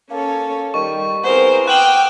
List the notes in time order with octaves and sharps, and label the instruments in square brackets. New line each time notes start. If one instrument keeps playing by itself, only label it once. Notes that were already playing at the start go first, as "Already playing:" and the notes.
[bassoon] A#3 [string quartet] C#4 A4 C#5
[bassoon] D#3 [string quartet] G3 [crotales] C#6 D#7
[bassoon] B3 [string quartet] C4 E4 G#4 [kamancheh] A#4 C5
[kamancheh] G5 [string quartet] D6 D#6 F6 [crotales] F#6 E7 F#7